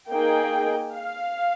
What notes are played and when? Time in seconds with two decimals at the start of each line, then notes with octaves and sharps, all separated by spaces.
0.10 A#3 D#4 G#4 G5
0.94 F5